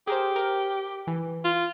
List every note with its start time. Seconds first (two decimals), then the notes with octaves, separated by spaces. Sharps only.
0.07 G4 G#4 A#4 C5
0.36 A#4
1.07 E3
1.45 F4